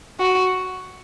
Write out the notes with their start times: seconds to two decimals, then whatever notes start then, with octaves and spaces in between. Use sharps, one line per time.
0.20 F#4